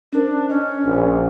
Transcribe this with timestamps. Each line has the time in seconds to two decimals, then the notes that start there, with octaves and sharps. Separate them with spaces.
0.13 C#4 D4 A#4 C5
0.49 C#4 D4 D#5
0.84 A#1